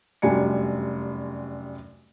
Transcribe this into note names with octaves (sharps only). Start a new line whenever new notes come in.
F1 F#2 G3 D4 G#5 C#7